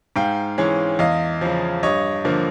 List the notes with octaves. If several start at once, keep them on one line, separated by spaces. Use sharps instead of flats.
G#2 F5 G5
E3 G#3 C#4
E2 D#5 F5
C#3 F3
G2 C#5 D#5
D3 F3 A#3